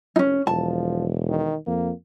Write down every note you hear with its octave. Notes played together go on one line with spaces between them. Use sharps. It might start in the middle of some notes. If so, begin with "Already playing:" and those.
F1 C#4 D#4
E1 F3 A5
D#3
F2 A#3